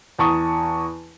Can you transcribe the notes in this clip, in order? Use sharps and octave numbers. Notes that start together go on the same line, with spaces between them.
E2 A5 A#5 C#6 D#6